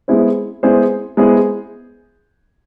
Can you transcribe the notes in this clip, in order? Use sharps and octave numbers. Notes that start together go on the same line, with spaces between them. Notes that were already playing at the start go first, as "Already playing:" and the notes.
G#3 B3 E4 G#4 C5
G#3 B3 E4 G#4 C5
G#3 B3 E4 G#4 C5